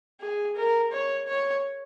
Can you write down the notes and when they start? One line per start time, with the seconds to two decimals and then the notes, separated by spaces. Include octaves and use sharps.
0.21 G#4
0.56 A#4
0.92 C#5
1.28 C#5